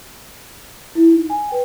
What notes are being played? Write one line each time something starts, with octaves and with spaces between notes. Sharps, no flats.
E4
D#4
G#5
B4 G5